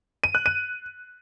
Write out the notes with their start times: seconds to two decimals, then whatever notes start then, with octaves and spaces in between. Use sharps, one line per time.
0.24 D#7
0.35 F#6
0.46 D#7